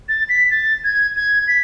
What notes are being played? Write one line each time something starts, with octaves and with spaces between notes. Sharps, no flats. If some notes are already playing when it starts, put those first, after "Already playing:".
A6
B6
A6
G#6
G#6
B6